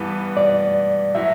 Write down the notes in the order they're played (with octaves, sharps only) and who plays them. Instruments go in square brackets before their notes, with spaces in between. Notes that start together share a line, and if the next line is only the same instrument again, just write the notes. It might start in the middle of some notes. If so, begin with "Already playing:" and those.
Already playing: [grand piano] G2 E3 B3
[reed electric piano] D5
[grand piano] A2 F#3 [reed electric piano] E5